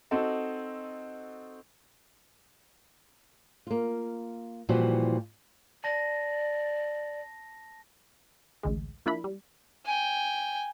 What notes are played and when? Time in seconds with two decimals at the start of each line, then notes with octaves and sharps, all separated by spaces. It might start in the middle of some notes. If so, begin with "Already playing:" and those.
0.11 C4 D#4 F#4 A4 D#5
3.67 A#3 F4
4.69 A#2 E3 F3 G3 F#4
5.84 D5 A5 A#6
8.63 A1 D2 G#3
9.06 F3 A#3 D4 E4 B5
9.24 G3
9.85 G5 G#5